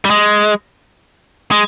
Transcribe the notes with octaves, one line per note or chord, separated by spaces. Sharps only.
G3
G#3
G#3